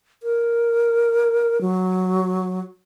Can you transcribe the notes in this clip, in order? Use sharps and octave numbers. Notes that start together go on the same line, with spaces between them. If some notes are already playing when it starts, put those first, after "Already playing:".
A#4
F#3